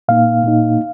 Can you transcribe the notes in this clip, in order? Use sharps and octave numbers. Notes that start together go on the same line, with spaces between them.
A#2 A#3 D#4 F5
A#2 A#3 D#4